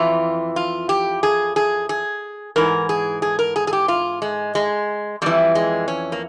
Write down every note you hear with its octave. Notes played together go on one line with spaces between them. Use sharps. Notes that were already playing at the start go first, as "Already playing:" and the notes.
Already playing: F2 E3 F4
F4
G4
G#4
G#4
G#4
G#2 E3 A#4
G#4
G#4
A#4
G#4
G#4
G4
F4
G#3
G#3
F2 E3 G3
G#3
C#4
A#3